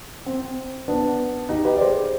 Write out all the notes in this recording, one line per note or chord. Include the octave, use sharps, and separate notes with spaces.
C4
B3 D4
D#4 G4
G4 B4
D5
G#4 C5